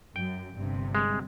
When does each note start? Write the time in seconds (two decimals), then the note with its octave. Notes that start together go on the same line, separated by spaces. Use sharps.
0.16 F#2 G5
0.55 G1 G2 C3
0.95 G#3